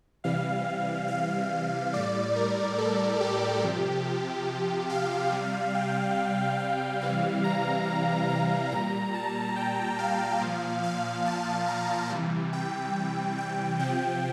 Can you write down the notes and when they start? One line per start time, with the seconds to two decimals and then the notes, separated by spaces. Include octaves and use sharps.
0.24 C3 E3 G3 F5
1.08 F5
1.93 A2 G3 D5
2.36 A#4
2.78 A4
3.20 G4
3.63 C3 F3
4.90 F5
5.32 C3 G3
5.75 G5
6.59 F5
7.01 C3 E3 G3 F5
7.44 A#5
8.29 A#5
8.72 A#2 G3 A#5
9.14 A5
9.56 G5
9.99 F5
10.41 A#2 F3
10.84 F5
11.26 A5
11.67 A#5
12.10 C3 E3 G3
12.53 G5
13.38 G5
13.79 C3 F3 G5